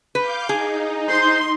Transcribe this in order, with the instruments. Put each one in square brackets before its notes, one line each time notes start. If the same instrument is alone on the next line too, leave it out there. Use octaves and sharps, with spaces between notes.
[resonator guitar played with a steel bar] B4 [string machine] F5 D6 G6
[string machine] D#4 [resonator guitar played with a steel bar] G#4
[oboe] C5 [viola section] C6